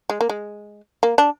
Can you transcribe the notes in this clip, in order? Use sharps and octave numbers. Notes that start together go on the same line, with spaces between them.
G#3
A#3
G#3
A#3
D4